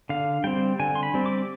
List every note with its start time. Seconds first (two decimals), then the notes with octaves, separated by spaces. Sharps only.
0.09 D3 F5
0.44 G3 C4 G5
0.79 D3 G#5
0.95 C6
1.03 B5
1.14 G3 C4
1.26 D6